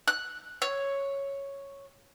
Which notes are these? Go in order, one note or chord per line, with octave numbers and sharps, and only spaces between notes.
F#6
C#5